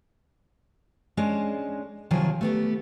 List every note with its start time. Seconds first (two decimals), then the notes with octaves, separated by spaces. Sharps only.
1.17 G#3 C#4 D4 D#5
2.11 C3 D#3 F3 F#3 G#4
2.41 A3 B3 G4